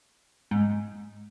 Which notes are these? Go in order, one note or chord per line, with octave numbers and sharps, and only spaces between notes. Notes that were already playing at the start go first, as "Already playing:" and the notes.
G#2